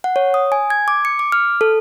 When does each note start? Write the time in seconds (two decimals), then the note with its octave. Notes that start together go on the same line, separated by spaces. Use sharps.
0.04 F#5
0.16 C#5
0.34 D#6
0.52 G#5
0.70 G#6
0.88 D6
1.05 C#7
1.19 D6
1.32 F6
1.61 A4